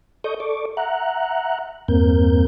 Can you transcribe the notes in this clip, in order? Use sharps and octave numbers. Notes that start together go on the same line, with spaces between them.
A4 D5 D#5 C#6 D#6 G6
A4 D5 C#6 D6
E5 F#5 A#5 F#6
E2 G2 A#3 C4 A#4 G6